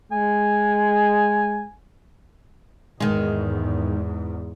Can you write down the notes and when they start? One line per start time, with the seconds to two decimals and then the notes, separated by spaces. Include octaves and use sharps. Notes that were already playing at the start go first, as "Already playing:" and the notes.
0.12 G#3 G#5
3.00 E2 G#2 D#3 G#3